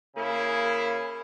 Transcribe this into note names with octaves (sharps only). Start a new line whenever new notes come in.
C#3 A#3 E4